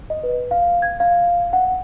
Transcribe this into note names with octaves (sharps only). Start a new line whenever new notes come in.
D#5
B4
F5
G#6
F5
F#5